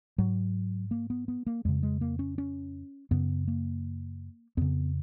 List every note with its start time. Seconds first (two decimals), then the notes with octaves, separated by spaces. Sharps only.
0.18 G#2 F#3
0.91 A#3
1.10 B3
1.28 B3
1.47 A#3
1.65 F2 C#3 G#3
1.83 G#3
2.01 A#3
2.19 C#4
2.38 C#4
3.11 F#2 C#3 B3
3.48 A#3
4.57 F2 C#3 B3